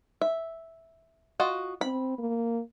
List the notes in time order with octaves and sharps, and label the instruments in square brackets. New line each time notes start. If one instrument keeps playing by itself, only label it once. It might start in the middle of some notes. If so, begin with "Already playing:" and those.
[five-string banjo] E5
F4 F#4 D#5
[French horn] C4 [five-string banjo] B5
[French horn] A#3